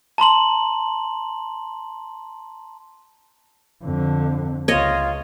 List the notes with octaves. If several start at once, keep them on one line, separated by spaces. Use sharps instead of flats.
A5 A#5 C6 F#7
F2 D3
C#2 F4 C#5 D#5